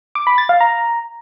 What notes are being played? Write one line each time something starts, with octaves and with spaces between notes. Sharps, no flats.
D6
B5
A6
F5
A#5